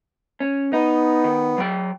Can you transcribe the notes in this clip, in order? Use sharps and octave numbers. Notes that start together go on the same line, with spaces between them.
C#4
B3 D#4
D#3
F#3 G5